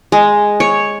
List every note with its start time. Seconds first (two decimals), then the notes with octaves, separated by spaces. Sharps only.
0.12 G#3
0.60 C#5